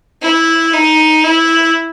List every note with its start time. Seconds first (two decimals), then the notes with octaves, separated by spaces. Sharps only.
0.23 E4
0.74 D#4
1.24 E4